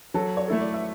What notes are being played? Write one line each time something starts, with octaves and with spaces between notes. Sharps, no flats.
F#3 A4
C#5
A3 E4 A4
D5
E5